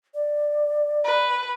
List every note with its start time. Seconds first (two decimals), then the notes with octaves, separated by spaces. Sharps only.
0.14 D5
1.05 B4